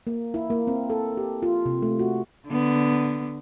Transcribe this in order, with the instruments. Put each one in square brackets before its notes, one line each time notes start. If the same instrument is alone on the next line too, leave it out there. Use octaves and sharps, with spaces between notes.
[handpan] A#3
E4
A#3
C4
A4
G4
F4
C3
A3
F#4
[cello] D3 B3